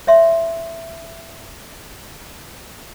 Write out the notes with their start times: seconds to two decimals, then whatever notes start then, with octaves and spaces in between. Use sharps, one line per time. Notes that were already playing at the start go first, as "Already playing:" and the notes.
0.07 C#5 E5 C6